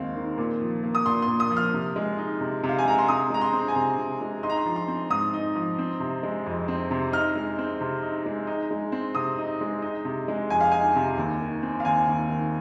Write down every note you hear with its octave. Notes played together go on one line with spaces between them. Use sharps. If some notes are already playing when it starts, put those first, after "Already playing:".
Already playing: D#2 D#3 G#3 C4 F5
D#3
A#2
F3
A#3
D#6
A#2 C6
C6
A#2
D#6
F3
F6
C3
G#3
D#4
C3
C3
F5
G#5
G#3 A#5
C6
C3 D#6
G#3 A#5
C6
C4
G#5
C3 A#5
C3
G#3
D#4 C6
A#5
C6
F3
C6
C4
G#2 D#6
D#4
F3
C4
C3
G#3
F2
C4
C3
D#4 F6
G#3
C4
C3
D#4
G#3
D#4
G#3
C4
C3 D#6
D#4
G#3
D#4
C3
G#3
F2 G#5
F5
D#4 G#5
C3
D#2
D#3
C4
F5
D#2 G#5
D#2
D#3